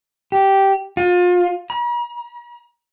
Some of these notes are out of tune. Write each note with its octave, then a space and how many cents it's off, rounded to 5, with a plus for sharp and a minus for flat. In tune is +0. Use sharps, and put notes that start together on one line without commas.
G4 -10
F4 +30
A#5 +45